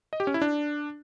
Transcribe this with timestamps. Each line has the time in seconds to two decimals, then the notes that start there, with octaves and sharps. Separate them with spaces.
0.13 D#5
0.20 G4
0.27 C#4
0.34 E4
0.42 D4